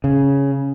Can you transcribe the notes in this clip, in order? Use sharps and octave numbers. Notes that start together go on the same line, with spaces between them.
C#3